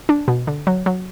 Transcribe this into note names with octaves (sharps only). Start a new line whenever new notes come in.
D4
B2
D3
F#3
F#3